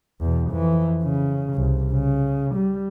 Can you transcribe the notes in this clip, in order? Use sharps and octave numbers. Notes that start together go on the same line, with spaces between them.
E2 B2
F2 E3
C#3
C2
C#3
G3